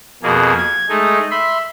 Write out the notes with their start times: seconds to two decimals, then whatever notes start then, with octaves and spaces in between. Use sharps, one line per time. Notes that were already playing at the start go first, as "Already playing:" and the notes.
0.23 F2 B2 A#3 G#4
0.58 G#6
0.89 G#3 A3 D#4
1.31 E5 B5 C6